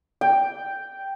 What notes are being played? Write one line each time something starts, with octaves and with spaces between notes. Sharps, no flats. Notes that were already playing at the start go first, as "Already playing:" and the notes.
G5